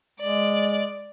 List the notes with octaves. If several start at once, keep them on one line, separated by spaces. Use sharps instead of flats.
G#3 D5